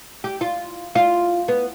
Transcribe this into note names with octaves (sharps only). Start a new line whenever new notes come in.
G4
F4
F4
B3